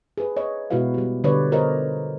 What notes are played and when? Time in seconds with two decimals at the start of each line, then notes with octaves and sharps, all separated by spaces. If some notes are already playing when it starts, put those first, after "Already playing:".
0.18 G#4 B4
0.36 C#5 D#5
0.70 B2 G#3 E4 F#4 B4 F5
0.94 G3 G4
1.24 D3 G3 B3 B4 C#5 D5
1.51 D4 F4 A#4 C5 C#5 D#5